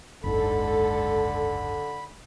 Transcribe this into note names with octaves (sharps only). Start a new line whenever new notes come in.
F#1 C#2 G#2 D3 A4 B5